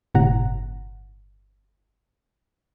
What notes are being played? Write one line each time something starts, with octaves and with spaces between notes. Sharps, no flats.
G1 A2 C3 F#5 A#5